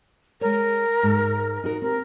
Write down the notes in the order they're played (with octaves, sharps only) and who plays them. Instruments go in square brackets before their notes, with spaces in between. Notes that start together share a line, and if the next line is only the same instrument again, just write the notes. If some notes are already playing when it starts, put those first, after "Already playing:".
[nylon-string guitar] G#3 C#5 [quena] A#4
[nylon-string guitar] G#2
D#4 F#4 A#4
[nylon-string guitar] C4 G4 [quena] A#4